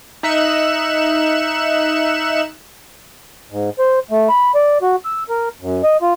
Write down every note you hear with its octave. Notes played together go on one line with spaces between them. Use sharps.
D#4 E5 F#6 C#7 E7
G#2
C5
A3
B5
D5
F#4
E6
A#4
F#2
D#5
F4